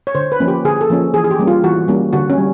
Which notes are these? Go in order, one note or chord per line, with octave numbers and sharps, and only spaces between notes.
C#5
D3 C5
B4
F3 A#3 C#4
G4
D3 G#4
A4
F3 A#3 C#4
E3 G#4
G#4
G4
G3 A#3 C#4
F4
E3 F#4
G3 A#3 C#4
D3 F#4
C#4
G3